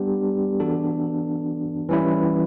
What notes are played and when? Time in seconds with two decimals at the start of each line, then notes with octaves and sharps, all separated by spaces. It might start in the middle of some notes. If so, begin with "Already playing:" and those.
Already playing: G3 B3 D4 G4
0.60 E3 B3 D4 F#4 A4
1.89 E3 G3 C#4 E4